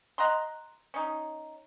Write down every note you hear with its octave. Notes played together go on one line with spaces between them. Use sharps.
D#5 F#5 A#5 C6
C#4 D#4